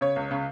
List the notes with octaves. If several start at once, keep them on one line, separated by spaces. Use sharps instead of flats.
C#3 C#5
C#2
C#3